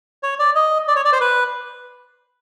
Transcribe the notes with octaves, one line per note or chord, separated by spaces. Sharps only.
C#5
D5
D#5
D5
C#5
D5
C5
B4